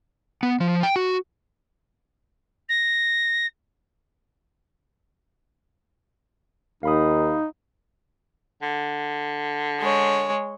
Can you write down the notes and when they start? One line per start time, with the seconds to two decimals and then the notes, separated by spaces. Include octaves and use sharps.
0.43 B3
0.60 F3
0.83 G5
0.96 F#4
2.69 A#6
6.83 D#2 D#4 F5 B5 D#6
8.62 D3
9.80 G#3 C#5